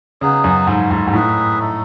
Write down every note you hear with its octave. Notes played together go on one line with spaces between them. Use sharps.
C#3 F#3 B3 D#4 G#4
F#2
G#2 A3 E4 A4
G#2
G#2
A2 D#4 G#4 B4 E5
A3 D#4 A4